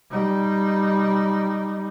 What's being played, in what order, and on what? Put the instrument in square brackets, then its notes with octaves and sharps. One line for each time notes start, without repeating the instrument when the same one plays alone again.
[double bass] G3 D#4